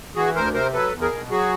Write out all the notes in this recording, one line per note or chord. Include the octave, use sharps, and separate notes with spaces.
E3 F#4 G#4
D2 A#4 C5
C3 A#4 C5
F#3 A4 B4
E2
G#4 A#4
B2
F#3 F#4 G#4